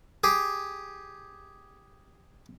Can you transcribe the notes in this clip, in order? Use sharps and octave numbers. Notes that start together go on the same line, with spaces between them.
G4 G#4